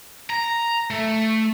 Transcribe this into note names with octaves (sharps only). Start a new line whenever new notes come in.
A#5
A3